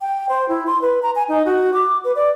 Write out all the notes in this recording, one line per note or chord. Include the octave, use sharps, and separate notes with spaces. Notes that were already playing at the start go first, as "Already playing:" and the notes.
G5
C5
E4
C6
B4
A#5
G#5
D#4
F#4
D6
B4
D5